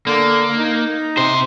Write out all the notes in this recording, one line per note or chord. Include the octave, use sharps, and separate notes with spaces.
D3 A#3
D#4
C3 C5